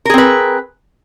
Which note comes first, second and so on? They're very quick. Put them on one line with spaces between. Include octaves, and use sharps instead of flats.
A#4 G#4 C4 B4